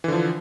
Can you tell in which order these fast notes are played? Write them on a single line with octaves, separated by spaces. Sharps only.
E3 D3 F3